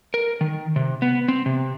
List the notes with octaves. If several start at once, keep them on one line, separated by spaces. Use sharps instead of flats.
A#4
D#3
C3
B3
C4
C3